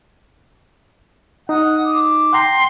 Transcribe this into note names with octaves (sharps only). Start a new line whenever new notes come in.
D#4 F#5 D#6
D6
F#5 G5 A#5 C6